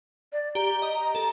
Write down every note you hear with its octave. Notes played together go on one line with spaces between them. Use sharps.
D5
G4 A#5
D#5
A4